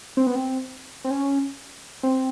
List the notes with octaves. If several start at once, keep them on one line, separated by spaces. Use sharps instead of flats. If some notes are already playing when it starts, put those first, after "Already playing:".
C4
B3
C4
C4
C#4
C4